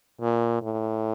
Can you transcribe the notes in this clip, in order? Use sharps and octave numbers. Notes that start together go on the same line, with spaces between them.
A#2
A2